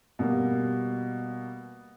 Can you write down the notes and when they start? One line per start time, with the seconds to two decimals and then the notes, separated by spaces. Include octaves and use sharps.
0.19 B2 G3 A#3